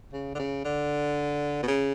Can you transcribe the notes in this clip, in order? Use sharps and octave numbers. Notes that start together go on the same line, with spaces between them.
C#3
D3
C#3
D3
B2
C#3